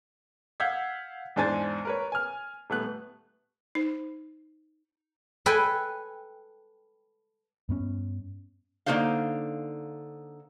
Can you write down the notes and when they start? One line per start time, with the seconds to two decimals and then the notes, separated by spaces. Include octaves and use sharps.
0.60 F5 F#5 E6 G6 G#6 B6
1.36 E2 G#2 D4 C5 G#5 A6
1.85 A#4 B4 C#5
2.12 G#5 F6
2.70 D#1 A3 B3 F#6
3.75 D#4 C5
5.46 A4 B4 G5 G#5
7.69 G2 B3 C#4
8.86 D3 A#3 D#4 F#4 C5 F5